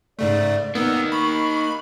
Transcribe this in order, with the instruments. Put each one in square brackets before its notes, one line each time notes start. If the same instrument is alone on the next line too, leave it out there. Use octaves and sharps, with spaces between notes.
[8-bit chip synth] G#2 C#3 A3 [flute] D5
[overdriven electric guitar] A#3 D#4 [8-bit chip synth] B3 [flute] E6
[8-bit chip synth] B5 [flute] C#6